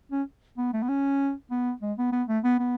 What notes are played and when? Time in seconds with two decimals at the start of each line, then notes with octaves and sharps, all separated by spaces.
0.12 C#4
0.58 B3
0.73 A3
0.82 B3
0.89 C#4
1.50 B3
1.82 G#3
1.98 B3
2.12 B3
2.28 A3
2.44 B3
2.59 B3